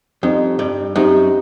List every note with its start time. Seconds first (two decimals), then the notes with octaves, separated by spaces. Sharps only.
0.22 F2 G3 C4 D#4 G4
0.59 G2
0.95 F#2 G3 C4 D#4 G4